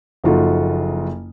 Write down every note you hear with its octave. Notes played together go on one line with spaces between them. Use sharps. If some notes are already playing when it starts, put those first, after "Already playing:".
F#1 F3 D#4 F4 F#4 A4